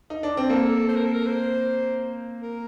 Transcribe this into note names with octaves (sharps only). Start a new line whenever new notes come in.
D#4
D4
C4
A#3 A4
C5
A#4
A4
A#4
C5
A#4